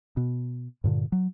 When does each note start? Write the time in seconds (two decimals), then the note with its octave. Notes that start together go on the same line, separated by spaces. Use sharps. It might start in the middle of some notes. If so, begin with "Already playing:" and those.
0.17 B2
0.84 G2 A#2 D3
1.12 F#3